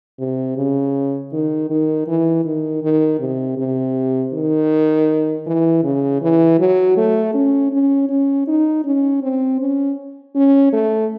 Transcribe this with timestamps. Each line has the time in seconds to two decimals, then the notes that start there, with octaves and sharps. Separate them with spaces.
0.19 C3
0.57 C#3
1.33 D#3
1.70 D#3
2.07 E3
2.45 D#3
2.83 D#3
3.20 C3
3.58 C3
4.33 D#3
5.47 E3
5.83 C#3
6.21 E3
6.59 F#3
6.97 A3
7.34 C#4
7.72 C#4
8.09 C#4
8.48 D#4
8.85 C#4
9.22 C4
9.60 C#4
10.35 C#4
10.73 A3